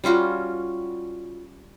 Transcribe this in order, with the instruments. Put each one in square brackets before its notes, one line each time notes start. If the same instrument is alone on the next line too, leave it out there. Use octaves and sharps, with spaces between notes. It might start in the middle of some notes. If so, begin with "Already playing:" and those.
[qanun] G3 C#4 F4 F#4